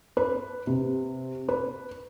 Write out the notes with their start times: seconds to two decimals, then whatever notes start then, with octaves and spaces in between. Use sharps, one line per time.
0.17 B4
0.67 C3
1.49 B4